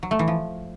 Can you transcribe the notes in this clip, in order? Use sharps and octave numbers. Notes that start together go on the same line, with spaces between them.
F#3
A3
E3
F3